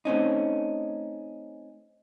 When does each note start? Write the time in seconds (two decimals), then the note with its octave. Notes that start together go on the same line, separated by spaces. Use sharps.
0.05 A3 C4 C#4 D#4